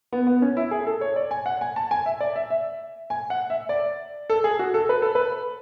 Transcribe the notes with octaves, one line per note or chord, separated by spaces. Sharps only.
B3
B3
C#4
E4
G#4
A4
C#5
D5
G#5
F#5
G#5
A5
G#5
E5
D5
E5
E5
G#5
F#5
E5
D5
A4
G#4
F#4
A4
B4
A4
B4